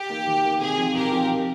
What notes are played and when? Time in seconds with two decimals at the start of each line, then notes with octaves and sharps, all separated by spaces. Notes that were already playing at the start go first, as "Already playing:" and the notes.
Already playing: G4
0.09 A#3 D#4
0.27 D#3
0.44 A#3 D#4
0.61 C3 G#4
0.78 F3 C4 D#4
0.94 C3 G4 A#4
1.12 F3 C4 D#4
1.29 C3